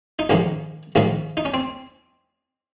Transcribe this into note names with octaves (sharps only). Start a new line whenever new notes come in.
D#4
A#1 G#2 D#3 A#3 C#4
A#1 G#2 D#3 A#3 C#4
D#4
C#4
C4